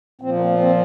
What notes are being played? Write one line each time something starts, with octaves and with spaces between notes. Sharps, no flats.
A#2 F3 C4
A#3
A#3
C4